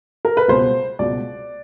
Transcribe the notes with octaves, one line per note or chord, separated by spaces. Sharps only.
A#4
B4
C#2 B2 C5
C#2 B2 D5